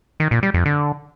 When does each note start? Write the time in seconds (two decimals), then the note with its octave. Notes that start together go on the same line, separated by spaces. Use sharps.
0.20 D#3
0.31 A#2
0.43 G3
0.54 F2
0.66 D3